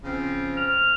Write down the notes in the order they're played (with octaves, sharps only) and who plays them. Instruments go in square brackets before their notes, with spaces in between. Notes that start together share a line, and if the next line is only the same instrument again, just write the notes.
[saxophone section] C#3 F3 C4
[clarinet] F6